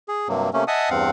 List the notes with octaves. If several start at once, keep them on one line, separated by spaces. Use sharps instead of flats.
G#4
G2 C3 F#3 A#3
C3 A3 A#3 C#4
D#5 E5 F#5 G#5 A5 D#6
E2 G2 C4 F5 F#5